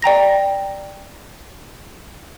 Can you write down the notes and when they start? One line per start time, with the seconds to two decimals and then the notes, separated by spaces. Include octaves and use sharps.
0.02 D5 G5 A#5 A#6